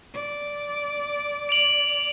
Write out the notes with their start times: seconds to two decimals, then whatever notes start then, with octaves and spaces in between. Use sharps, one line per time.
0.14 D5
1.49 D7 F7 F#7